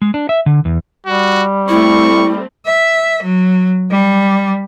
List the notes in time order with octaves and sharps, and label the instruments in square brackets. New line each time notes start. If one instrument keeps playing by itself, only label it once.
[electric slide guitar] G#3
D4
E5
D3
E2
[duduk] G3 [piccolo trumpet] F#4
[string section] A3 C4 [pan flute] E4 [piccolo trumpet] C#6
[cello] E5
F#3
G3